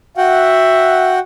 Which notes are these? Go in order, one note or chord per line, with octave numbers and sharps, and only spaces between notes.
F#4 E5 F#5 G5